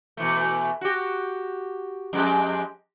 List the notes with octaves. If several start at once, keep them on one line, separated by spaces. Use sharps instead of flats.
B2 E3 A3
F#4 G4
F2 G#3 G4